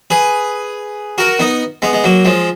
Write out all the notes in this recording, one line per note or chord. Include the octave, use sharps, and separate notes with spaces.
G#4 B4
F#4 A#4
B3 D#4
G#3 B3
G#3
F#3 A#3
F3 G#3